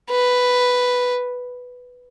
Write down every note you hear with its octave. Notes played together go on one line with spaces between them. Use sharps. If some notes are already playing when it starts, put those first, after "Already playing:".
B4